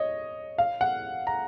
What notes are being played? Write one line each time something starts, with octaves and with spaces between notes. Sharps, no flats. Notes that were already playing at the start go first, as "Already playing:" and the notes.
Already playing: C#5 D#5
F5
F#5
A#5